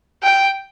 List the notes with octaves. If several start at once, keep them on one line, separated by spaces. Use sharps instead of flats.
G5